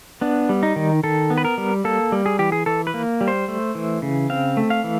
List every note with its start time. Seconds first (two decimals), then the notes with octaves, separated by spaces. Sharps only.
0.21 B3 D4
0.49 G3
0.63 D#4
0.76 D#3
1.03 D#3 A4
1.30 B3
1.38 B4
1.45 A#4
1.58 G3
1.84 A#3 A4
2.12 G3
2.26 G#4
2.39 E3 G4
2.52 G#4
2.66 E3 A4
2.87 B4
2.94 A#3
3.21 G3
3.28 C5
3.48 A3
3.75 E3
4.02 C#3
4.30 C4 F5
4.57 A3
4.70 F5
4.84 E3